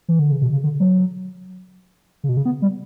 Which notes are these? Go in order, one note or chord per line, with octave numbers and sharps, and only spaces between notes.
E3
D3
C#3
B2
C#3
D3
F#3
C#3
B2
C#3
B3
G3